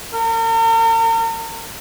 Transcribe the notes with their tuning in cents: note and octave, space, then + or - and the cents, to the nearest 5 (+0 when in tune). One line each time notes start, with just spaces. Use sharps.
A#4 -45